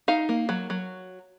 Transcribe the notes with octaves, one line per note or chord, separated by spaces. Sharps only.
D#4 F5
A#3
F#3
F#3